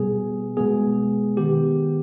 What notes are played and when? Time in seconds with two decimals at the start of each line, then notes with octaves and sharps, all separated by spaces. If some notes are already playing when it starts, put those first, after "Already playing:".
Already playing: B2 G3 B3 G#4
0.57 B2 G#3 B3 G#4
1.37 D#3 B3 G4